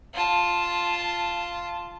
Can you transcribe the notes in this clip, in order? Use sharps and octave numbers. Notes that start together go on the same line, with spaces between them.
F4 A5